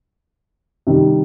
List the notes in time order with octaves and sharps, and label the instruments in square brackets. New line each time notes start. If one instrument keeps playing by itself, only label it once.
[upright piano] C3 D#3 G3